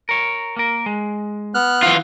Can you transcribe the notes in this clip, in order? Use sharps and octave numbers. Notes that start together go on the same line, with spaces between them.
A#4 C#5
A#3 A#4
G#3
B3 F6 F#6
E3 F4